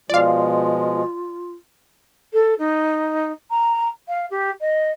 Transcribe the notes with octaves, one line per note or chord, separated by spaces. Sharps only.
B2 F3 G#3 F4 D5 F5
A4
D#4
A#5
F5
G4
D#5